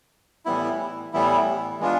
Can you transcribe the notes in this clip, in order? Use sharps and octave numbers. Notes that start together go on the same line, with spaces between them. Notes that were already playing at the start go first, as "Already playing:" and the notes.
A2 E3 G3 B3 E4
A2 E3 G3 B3 E4
E3 G#3 B3 D4 F4